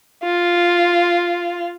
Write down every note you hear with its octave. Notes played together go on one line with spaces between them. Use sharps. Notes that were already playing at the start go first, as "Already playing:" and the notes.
F4